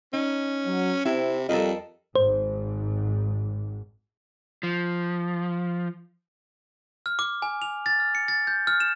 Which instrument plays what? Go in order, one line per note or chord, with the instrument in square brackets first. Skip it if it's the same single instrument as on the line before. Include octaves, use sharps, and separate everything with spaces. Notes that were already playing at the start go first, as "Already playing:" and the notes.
[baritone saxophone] C#4 [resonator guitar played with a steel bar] D#4
[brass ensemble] F#3
[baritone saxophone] C3 [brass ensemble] C4 [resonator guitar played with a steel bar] E4
[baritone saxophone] F2 [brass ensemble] F3 G3 [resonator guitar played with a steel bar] A4 A#4 D#5
[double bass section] G#1 G#2 [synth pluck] C5
[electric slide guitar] F3
[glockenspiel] F6
D6
G#5
F7
A6
F6
C#7
A6
G6
F6
E7